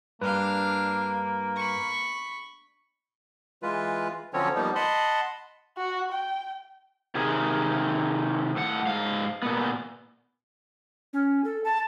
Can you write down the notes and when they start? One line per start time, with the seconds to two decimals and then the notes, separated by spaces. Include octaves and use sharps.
0.22 G2 A#3 D4 G4 B4 F5
1.56 B5 C#6
3.62 E3 G#3 F4 B4
4.33 D3 F3 F#3 C4 C#4 C#5
4.55 F3 G3 A#3 B3 D#4
4.75 D#5 F#5 A5 B5 C6
5.78 F#4
6.13 G5
7.15 C3 D#3 G#4
8.56 A2 F#5
8.86 G#2 F5
9.42 A#2 B3
11.13 C#4
11.44 A4
11.64 A5